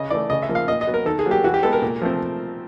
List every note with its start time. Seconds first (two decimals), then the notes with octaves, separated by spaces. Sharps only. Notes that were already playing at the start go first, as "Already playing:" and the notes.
Already playing: C#3 D#5
0.10 E3 A3 D5
0.30 C#3 D#5
0.43 E5
0.49 F3 A#3
0.55 F5
0.68 A#2 D#5
0.81 D#5
0.87 F#3 B3
0.94 A#4
1.06 D#3 A4
1.19 G#4
1.26 F#3 A#3
1.31 G4
1.44 E3 F#4
1.54 G4
1.63 G#3 B3 A4
1.73 A#4
1.82 A#2
2.01 F3 A3 C4